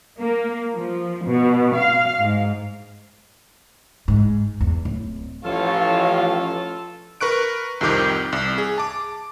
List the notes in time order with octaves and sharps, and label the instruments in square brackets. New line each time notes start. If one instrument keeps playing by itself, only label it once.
[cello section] A#3
F3
B2
F5
G#2
[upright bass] G#2
E2
D1
[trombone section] A1 [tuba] F3 [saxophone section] F4 A4 [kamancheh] C#5 F5
[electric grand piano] A#4 B4 C#6 F#6 D7
C2 F2 C3 D#3 D6 G6
C2
G#4
A5 D6